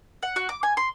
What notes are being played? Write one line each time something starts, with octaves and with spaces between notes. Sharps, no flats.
F#5
F#4
D6
G#5
C6